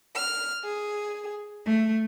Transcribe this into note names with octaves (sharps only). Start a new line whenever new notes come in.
F6
G#4
A3